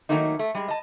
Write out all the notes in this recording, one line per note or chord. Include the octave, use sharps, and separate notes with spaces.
D#3 F#3 A3 A#3 D#4
A3
G3 G#3
D#5 A5